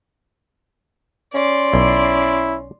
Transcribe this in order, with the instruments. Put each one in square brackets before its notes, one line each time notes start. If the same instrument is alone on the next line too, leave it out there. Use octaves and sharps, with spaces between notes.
[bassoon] C#4 [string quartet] D5 C6
[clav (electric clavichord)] B1 [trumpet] E4